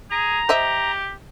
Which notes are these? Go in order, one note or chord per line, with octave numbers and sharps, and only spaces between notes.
G#4 A#5
G4 C5 D#5 E5